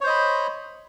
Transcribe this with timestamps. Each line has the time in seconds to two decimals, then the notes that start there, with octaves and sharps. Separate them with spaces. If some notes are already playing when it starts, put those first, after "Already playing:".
0.01 C#5
0.04 C5
0.07 D#5
0.10 B5